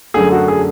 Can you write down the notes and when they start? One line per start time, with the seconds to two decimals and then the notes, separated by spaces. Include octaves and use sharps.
0.14 F#2 D3 A3 G#4
0.32 F#4
0.48 G#4